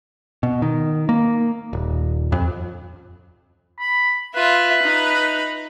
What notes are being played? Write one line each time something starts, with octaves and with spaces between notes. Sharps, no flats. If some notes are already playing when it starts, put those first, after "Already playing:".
B2
D#3
A#3
D#1
F2
B5
F4 B4 E5
D#4 B5